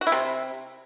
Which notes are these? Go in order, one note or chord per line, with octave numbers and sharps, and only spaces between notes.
F#4
E4
C3